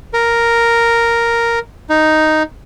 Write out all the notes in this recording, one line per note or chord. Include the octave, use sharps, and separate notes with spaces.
A#4
D#4